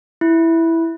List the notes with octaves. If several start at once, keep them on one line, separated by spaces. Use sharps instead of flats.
E4